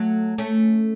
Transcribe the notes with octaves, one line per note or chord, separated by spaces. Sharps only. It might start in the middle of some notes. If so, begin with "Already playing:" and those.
Already playing: F#3 A3
A3 C#4